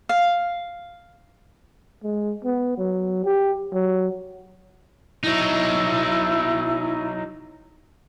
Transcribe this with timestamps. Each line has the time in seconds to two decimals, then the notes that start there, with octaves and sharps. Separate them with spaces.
0.09 F5
2.04 G#3
2.44 B3
2.78 F#3
3.25 G4
3.73 F#3
5.23 F#3 D#4 E4